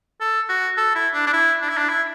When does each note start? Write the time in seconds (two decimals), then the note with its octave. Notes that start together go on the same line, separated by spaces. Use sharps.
0.21 A4
0.49 F#4
0.77 A4
0.95 E4
1.14 D4
1.26 D4
1.33 E4
1.62 D4
1.69 E4
1.77 D4
1.89 E4